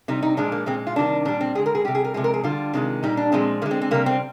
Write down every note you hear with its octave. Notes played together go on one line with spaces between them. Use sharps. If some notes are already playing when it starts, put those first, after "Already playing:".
C3 G3 D#4
D#4
A#2 F3 G#3 D4
A#3
A#2 G#3 C4
F4
C3 D#3 G3 D4
A#2 G3 D4
C4
D3 G#3 G#4
A#4
G#4
C3 G3 G4
G#4
A#4
C3 F3 G#3 G#4
A#4
G#4
D3 G3 F4
C3 D#3 G#3
A#2 G3 D#4
D4
A#2 F3 G#3 C4
D3 G#3 A#3
C4
C4
C3 G3 A#3
C4